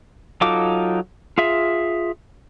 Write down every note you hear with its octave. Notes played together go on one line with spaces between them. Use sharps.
F#3 D#4 F4 A4 D6
F4 G#4 E5